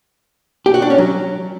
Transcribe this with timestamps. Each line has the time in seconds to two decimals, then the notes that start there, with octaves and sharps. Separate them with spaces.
0.66 G4
0.74 F#4
0.82 D4
0.90 C#4
0.98 F#3